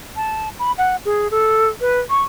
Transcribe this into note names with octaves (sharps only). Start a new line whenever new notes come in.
A5
B5
F#5
G#4
A4
B4
C#6